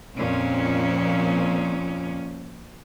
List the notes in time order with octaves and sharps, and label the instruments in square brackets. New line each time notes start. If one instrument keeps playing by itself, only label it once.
[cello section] F2 A#2 C#4